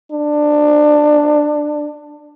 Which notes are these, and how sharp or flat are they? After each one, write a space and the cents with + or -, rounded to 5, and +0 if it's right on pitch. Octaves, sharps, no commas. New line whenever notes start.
D4 +20